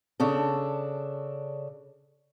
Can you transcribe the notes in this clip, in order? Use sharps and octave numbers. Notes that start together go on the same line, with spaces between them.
C#3 D4 A4